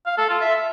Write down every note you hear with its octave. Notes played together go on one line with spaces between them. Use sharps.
F5
A4
F4
E5